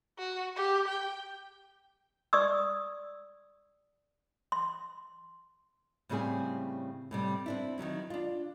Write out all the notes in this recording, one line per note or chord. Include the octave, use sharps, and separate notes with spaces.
F#4
G4
G5
D5 C#6 D#6 E6
C6
A2 C#3 G3 C4 G#4 G#5
A2 C3 G3
C4 D4 E4
D#3 F3 F#3 E4
D4 F4